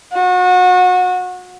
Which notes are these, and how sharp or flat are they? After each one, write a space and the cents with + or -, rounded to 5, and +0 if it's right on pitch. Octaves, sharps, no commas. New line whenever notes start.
F#4 -30